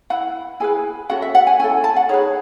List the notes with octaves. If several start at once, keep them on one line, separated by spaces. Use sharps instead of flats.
E4 B4 F#5
E4 G#4 B4 G#5
C#4 F#4 A4 F#5
E5
F#5
G#5
C#4 E4 A4 G#5
A5
F#5
D#4 G#4 B4 C#5